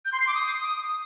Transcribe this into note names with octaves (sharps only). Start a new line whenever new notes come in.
G6
C6
C7
D6
D#6